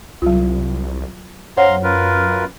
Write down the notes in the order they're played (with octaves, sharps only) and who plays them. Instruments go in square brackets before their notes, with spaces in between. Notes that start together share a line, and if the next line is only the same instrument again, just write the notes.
[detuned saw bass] C2 [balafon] F#3 F4
[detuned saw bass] F#2 [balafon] C5 C#5 F#5 [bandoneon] F5 A#5 C6
[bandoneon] F4 A#4 B4